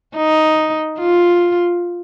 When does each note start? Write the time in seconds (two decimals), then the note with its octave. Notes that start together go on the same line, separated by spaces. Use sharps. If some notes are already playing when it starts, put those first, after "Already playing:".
0.16 D#4
0.99 F4